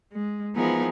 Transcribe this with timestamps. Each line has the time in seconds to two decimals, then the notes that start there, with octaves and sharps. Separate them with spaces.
0.13 G#3
0.55 E3 F3 B3 D#4 G#4 A#4